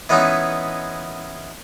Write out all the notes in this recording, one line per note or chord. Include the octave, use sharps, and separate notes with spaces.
E3 G#3 B3 C#4 D#4